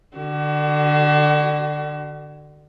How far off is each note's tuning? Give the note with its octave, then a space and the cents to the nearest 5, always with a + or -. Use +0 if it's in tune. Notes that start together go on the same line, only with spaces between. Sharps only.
D3 +20 F#4 +35